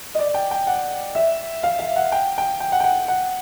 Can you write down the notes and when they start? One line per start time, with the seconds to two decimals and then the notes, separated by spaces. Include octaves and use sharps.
0.15 D#5
0.19 D5
0.34 G5
0.51 G5
0.67 F#5
1.15 E5
1.63 F5
1.79 F5
1.96 F#5
2.12 G5
2.38 G5
2.60 G5
2.72 F#5
2.80 G5
2.84 F#5
3.08 F#5